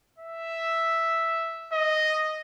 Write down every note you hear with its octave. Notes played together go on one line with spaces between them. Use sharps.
E5
D#5